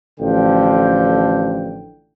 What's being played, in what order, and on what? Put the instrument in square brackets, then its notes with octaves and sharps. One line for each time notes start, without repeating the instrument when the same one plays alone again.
[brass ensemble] A1 D3 F3 G5